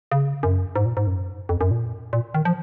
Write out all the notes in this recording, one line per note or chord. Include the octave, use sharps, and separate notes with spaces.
C#3
F#2
G#2
A#2
G#2
F#2
F2
F#2
A#2
A#2
D#3
F3